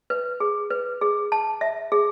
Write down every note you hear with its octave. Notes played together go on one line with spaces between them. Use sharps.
B4
G#4
B4
G#4
A5
E5
G#4